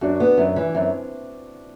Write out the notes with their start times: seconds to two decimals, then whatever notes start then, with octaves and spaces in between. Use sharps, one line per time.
0.01 F#2 D4 F#4
0.20 B3
0.38 F#2
0.56 E3
0.74 F#2 C4 E4